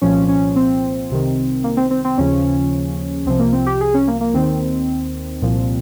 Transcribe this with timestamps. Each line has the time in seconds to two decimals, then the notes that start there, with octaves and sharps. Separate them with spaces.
0.02 C2 A#2 F3 C#4
0.28 C#4
0.56 C4
1.10 C2 C3 D#3
1.64 A#3
1.77 C4
1.91 C4
2.05 C4
2.18 D#2 C#3 F3 C#4
3.25 C2 C3 F3 C4
3.39 A#3
3.53 C4
3.66 G4
3.81 G#4
3.94 C#4
4.08 A#3
4.21 A#3
4.34 D#2 D#3 C4
5.42 C2 A#2 F3